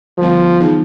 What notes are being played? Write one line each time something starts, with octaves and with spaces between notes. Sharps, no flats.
D3 F3 G3 B3
E3 G3 B3 D#4 G#4